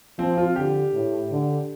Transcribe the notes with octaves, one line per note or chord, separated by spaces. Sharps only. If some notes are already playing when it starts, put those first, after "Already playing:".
F3 C4
F4
D3 G4
A2
D3